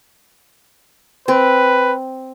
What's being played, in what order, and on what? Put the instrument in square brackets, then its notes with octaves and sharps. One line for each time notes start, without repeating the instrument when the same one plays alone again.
[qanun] C4 [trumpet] B4